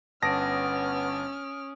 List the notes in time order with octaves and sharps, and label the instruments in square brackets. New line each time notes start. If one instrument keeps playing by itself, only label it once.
[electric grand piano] G1 A5 A#6 [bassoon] B3 [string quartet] C#4 F6 [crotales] D#6 D7